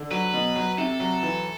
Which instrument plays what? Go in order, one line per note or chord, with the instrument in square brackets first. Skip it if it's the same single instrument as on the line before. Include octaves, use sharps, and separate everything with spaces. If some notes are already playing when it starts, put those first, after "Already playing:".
Already playing: [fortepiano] D3
[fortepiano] F#3 [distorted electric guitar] B4
[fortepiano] B2
F#3
[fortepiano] C3 [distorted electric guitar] A4
[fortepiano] F#3
E3